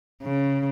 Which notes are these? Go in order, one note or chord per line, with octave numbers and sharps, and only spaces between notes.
C#3